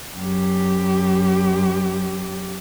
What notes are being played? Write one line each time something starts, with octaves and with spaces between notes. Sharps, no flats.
F#2 G4